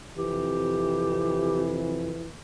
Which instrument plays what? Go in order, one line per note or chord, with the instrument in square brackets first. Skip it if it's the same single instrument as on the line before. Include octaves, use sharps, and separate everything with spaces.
[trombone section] F2 C3 E3 [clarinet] G4